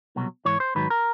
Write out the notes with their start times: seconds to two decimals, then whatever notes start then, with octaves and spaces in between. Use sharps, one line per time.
0.16 C2 B2 F#3
0.45 G#2 E3 C#5
0.60 C5
0.75 G#2 D#3 F#3 B4
0.90 A#4